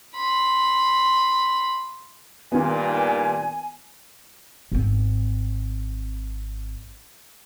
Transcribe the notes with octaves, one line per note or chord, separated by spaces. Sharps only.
B5 C6
G2 A#2 D#3 B3 G#5
G#1 C4